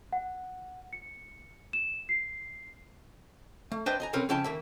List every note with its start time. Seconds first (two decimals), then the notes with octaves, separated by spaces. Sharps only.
0.13 F#5
0.93 C#7
1.73 E7
2.09 C7
3.72 A3
3.86 D4 B4 C5 D#5 E5 G5
4.00 D#5 G#5 A#5
4.13 B1 C3 C4 C#4 A#4 B4
4.29 C#3 F3 C#4 E4 G5 A5
4.44 D#3 A#3 E5